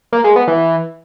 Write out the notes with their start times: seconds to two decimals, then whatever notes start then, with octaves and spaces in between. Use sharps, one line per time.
0.13 A#3
0.24 G#3
0.36 B3
0.48 E3